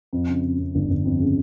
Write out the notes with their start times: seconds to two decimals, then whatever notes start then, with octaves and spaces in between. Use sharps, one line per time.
0.13 F2
0.28 C#3
0.43 F2
0.59 F2
0.75 G1
0.90 G1
1.05 F2
1.20 C#3